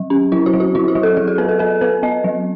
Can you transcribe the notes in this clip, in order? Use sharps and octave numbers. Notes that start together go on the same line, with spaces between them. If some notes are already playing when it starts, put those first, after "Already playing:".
Already playing: F#3
C#4
F#3 E4
F#4
F#3
F#4
F#3 E4
F#4
F#3
A4
F#3 G#4
G#4
B3 B4
A4
B3 A4
B3 B4
B3 D#5
F#3